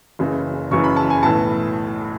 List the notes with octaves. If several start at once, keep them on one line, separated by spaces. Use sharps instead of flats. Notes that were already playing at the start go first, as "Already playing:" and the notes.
F#1 F#2 C#3 E3
F#1 F#2 C#3 E3 C#6
B5
A5
G#5
B1 A2 E3 A5